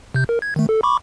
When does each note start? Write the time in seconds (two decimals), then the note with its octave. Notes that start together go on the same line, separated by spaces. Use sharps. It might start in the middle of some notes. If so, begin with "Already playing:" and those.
0.14 C3 G6
0.29 A#4
0.42 G#6
0.56 D#3 A3
0.69 A4
0.83 B5 C#6 D6